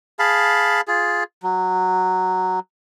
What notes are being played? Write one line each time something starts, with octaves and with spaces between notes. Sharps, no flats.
G#4 F5 A5 B5
F4 G#4
F#3